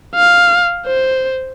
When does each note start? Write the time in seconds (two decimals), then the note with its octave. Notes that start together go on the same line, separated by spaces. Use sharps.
0.15 F5
0.86 C5